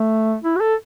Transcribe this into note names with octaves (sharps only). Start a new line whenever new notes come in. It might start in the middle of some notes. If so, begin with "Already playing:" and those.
Already playing: A3
E4
F#4
A4